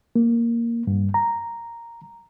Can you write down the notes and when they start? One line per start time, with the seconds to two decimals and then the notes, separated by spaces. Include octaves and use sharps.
0.16 A#3
0.87 G2
1.14 A#5